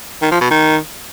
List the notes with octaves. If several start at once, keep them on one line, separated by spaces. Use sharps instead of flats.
D#3
F3
B2
D#3